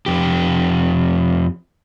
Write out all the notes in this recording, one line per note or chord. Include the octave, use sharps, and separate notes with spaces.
F2 G4